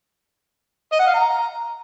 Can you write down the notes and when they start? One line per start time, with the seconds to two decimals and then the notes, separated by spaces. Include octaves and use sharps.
0.92 D#5
1.00 F#5
1.07 F5
1.14 A#5